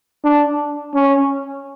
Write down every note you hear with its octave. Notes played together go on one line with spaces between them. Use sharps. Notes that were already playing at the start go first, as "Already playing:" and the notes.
D4
C#4